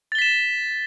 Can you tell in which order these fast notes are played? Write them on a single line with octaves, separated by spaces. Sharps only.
A6 G7 B6 E7